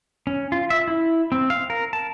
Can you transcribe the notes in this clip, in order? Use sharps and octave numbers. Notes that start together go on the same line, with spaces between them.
C#4
F4
E5
E4
C4
F5
A#4
A5